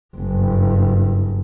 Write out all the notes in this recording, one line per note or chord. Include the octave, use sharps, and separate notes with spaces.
F#1 G2